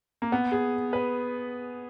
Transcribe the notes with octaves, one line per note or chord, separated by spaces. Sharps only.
A#3
B3
G#4
B4